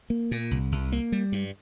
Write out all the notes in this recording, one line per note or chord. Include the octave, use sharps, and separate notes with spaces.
A#3
A#2
C2
C2
A#3
G3
G2